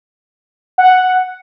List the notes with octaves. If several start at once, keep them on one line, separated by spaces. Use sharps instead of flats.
F#5